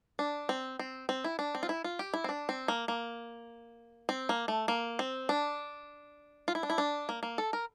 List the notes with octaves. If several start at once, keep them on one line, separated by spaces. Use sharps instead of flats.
D4
C4
C4
C4
E4
D4
C4
F4
E4
F4
G4
E4
C4
D4
C4
A#3
A#3
C4
A#3
A3
A#3
C4
D4
F4
E4
D4
E4
D4
A#3
A#3
A4
A#4